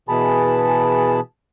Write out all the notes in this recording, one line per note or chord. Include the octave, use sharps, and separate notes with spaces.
B2 E3 G#4 A5 B5